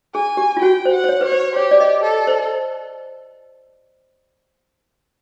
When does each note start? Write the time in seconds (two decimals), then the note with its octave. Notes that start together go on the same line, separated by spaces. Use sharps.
0.14 G#4 G#5
0.37 G4
0.57 F4
0.61 F#4 G5
0.85 C5
0.93 F#5
1.04 C5
1.09 C#5
1.21 B4 C#5
1.32 C5
1.56 G4 C#5
1.71 D5
1.80 D#5
2.04 A4
2.27 C5